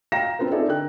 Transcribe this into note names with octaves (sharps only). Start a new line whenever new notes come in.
F5 G5 A#5 A#6 E7
C4 F4 A4 B4
C4 D#4 G#4 A4 D5 E5
D3 A#4 G5 F#6